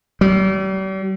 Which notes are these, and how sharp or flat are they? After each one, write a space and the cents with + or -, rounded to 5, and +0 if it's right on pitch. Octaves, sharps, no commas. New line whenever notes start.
G3 -40